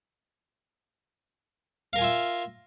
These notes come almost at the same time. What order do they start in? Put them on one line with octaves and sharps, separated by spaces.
F5 A#4 G#5 F4 E5